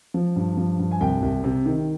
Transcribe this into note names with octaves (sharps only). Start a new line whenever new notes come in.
F3
G2
F3
G2
G#5
C2 G5
C2
C3
D#3